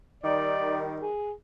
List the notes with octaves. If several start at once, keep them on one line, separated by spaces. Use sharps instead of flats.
D#3 G3 D5
G#4